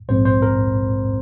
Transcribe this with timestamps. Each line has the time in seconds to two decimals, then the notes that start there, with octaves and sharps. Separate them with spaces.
0.09 A#1 G#2 G#3 C4 C5
0.25 C5
0.42 A#4